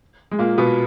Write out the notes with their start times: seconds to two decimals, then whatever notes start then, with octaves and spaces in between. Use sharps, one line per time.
0.31 G#3
0.39 A#2 A#3
0.58 B2 B3